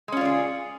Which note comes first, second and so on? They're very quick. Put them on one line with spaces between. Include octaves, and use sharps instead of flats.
G#3 C#4 F4 D5 G#4